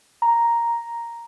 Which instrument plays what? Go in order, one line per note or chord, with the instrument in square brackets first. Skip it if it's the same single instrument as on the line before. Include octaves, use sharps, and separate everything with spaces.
[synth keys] A#5